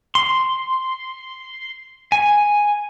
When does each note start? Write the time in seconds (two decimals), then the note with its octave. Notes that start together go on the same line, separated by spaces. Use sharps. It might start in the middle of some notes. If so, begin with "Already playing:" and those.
0.15 C6
2.12 G#5